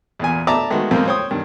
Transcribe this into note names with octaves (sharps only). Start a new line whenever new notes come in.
E2 A#2 G#5
D5 E5 A5 A#5 D6
D#3 G#3 A3 B3 F#4
F2 F3 G#3 A#3 C4 F4
C5 C#5 G5 D#6
G2 D#3